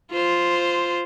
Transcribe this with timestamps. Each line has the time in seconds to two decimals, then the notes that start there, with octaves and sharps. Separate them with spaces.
0.12 F4 C5